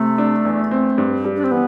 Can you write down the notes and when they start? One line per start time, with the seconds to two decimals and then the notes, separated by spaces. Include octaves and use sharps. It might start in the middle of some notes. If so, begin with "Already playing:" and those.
Already playing: C3 A3
0.18 D4
0.45 E2
0.71 C4
0.98 G2
1.25 G3
1.36 D4
1.44 C4
1.51 E3 B3